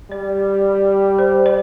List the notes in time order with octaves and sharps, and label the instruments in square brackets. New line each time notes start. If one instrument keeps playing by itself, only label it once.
[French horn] G3 [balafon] D5
[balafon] C5
D5